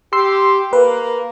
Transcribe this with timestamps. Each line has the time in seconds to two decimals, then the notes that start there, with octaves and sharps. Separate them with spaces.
0.13 G4 C6 E6 C7
0.73 A#3 B4